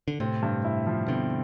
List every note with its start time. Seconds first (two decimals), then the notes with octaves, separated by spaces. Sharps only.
0.08 D3
0.20 A2 C3 C4
0.43 G2
0.64 E4
0.87 F3
1.08 B2 D3 C4